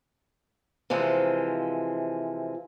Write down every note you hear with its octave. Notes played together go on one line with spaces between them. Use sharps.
C3 E3 F3 G#3